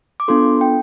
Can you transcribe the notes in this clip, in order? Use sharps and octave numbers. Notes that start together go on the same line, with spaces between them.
D6
B3 D4 F4 A4 C6
G5